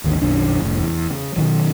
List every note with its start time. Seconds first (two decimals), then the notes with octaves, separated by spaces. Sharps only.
0.04 G#1 D#2 D3
0.21 B1 F#2 D#3 D4
0.62 F1 A2
0.81 E2
1.10 C#3
1.36 B2 D#3 F#3